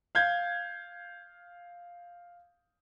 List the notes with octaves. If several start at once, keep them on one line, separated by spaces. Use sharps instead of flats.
F5 G6 G#6